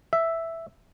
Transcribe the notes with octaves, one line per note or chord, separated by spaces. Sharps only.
E5